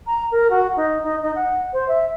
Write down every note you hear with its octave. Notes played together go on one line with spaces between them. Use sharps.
A#5
A#4
F#4
D#4
D#4
D#4
F#5
C5
E5